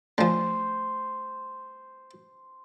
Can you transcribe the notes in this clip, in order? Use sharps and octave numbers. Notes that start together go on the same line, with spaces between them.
D3 F3 A3 C5